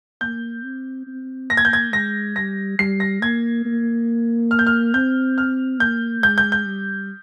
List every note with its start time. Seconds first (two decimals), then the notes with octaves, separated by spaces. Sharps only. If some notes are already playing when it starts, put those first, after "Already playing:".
0.21 A#3 G6
0.64 C4
1.07 C4
1.50 A#3 A#6
1.57 G#6
1.65 G6
1.73 G#6
1.93 G#3 A#6
2.36 G3 A#6
2.79 G3 C7
3.00 A#6
3.22 A#3 G#6
3.65 A#3
4.51 F6
4.59 G6
4.67 F6
4.94 C4 G6
5.38 F6
5.80 A#3 G6
6.23 G#3 G6
6.38 G6
6.52 G6
6.66 G3